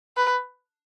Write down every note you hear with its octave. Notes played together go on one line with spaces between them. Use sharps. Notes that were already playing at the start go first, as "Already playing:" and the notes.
B4